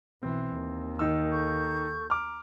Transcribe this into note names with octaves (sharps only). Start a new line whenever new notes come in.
B1 E3 C4
D#2
D#3 D#4 E6
A4 C#6 G6
A#5 D6 F6